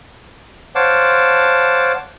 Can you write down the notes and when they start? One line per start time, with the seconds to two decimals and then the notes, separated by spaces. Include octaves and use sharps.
0.75 C5 C#5 F5 F#5 A5 D6